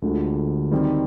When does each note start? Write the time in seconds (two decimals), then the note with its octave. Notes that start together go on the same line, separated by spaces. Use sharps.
0.02 D2 D3 G#3 D4 F4
0.71 D#3 G3 C4